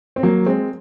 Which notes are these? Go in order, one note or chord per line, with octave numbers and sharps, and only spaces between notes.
C4
F#3 A#3
G#3 C4